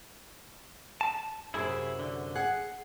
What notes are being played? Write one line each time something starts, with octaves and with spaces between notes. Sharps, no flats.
A5
F#2 C3 E4 G#4
D3
G#4 F#5